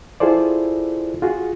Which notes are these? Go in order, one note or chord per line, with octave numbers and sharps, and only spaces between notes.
E4 F4 G#4 A4 C5 D5
F4 F#4 G#4